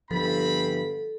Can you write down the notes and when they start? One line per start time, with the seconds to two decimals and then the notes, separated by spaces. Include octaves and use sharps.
0.11 G1 F3 C4 A4 B5